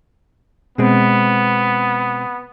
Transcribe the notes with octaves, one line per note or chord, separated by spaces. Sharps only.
B2 G#3 B3 C4